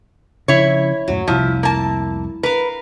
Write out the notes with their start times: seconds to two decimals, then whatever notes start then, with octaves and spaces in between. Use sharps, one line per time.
0.48 C#3 F3 E4 C#5
1.08 D#1 F#2 A2 F#3
1.28 F1 C2 F3 E4
1.63 A#3 A5
2.43 A#4 B4 F5